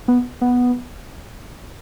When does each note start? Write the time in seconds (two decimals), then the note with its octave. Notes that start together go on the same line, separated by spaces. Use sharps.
0.08 B3
0.41 B3